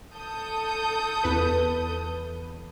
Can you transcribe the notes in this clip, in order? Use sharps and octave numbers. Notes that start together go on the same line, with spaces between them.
A4 D#6 G6
E2 B4